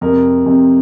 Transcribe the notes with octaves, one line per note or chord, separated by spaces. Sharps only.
F2 C3 A#4
F2 C3